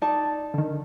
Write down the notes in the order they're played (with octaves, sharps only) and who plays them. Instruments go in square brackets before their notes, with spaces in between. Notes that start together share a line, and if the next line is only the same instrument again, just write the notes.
[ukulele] D#4 D5 A5
[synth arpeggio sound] D3 D#3